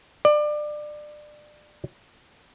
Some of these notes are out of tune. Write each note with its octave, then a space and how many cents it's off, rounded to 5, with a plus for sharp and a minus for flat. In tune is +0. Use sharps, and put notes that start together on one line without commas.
D5 +25